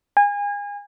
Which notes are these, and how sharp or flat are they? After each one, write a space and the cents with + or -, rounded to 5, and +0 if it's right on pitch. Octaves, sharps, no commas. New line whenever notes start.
G#5 -30